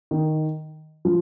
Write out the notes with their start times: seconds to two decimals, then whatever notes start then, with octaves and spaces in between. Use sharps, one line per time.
0.11 D#3
1.05 F3